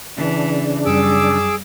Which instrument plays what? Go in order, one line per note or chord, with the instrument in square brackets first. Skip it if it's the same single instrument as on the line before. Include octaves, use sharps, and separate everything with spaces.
[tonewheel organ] C#3 D4 [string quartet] E3
[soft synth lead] F#2 [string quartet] G3 [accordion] G#4 D6 E6